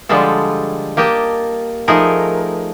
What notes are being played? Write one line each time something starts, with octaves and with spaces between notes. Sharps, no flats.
D3 F3 G3 G#3 F4 A4
A#3 G4 D#5 G5 A5
F3 A3 D#4 G#4 A#4